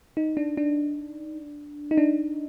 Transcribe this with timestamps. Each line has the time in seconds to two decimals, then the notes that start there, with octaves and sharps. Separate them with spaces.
0.17 D#4
0.37 D4
0.57 D4
1.91 D#4
1.97 D4